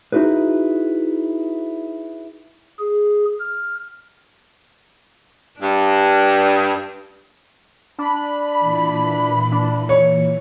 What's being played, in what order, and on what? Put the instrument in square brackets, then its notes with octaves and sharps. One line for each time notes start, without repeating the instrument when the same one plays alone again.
[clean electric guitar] D#4 E4 F#4 G#4 B4
[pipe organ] G#4
F6
[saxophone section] G2 [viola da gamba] D4
[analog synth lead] D4 [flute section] B5
[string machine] A#2 E3
[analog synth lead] D4
[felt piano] C#5 [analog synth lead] C#7